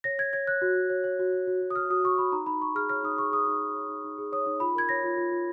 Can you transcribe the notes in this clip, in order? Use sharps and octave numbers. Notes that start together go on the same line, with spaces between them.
C#5 A#6
C#5 G#6
C#5 G#6
C#5 F#6
F#4
F#4
C#5
C#5
F#4
C#5
F#4
F#4
D#6
F#4 F6
F#4 D#6
F#4 C#6
F#4 B5
D#4 A#5
D#4 B5
D#4 C#6
G#4 F6
C#5 F6
D#4 D#6
G#4 C#6
G#4 D#6
D#4
D#4
C#5
D#4
D#4
G#4
C#5 D#6
D#4
F4 B5
A#4 G#6
C#5 A#6
F4
F4
F4